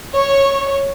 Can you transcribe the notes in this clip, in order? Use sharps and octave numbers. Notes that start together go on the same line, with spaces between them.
C#5